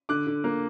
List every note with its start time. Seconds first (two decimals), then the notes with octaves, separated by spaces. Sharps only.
0.09 D3 D6 F#6
0.27 D3
0.44 A#3